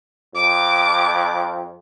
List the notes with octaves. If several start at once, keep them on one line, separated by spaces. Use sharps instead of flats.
F2 D6